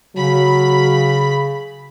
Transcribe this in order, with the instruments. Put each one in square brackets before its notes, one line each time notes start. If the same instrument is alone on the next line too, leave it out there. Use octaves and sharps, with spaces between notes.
[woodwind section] C#3 [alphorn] F#3 [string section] B5